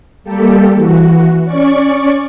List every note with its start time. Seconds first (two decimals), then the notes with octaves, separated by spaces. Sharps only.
0.24 G3 A#3 G4 A4
0.75 E3 F#4
1.44 C#4 D5 C#6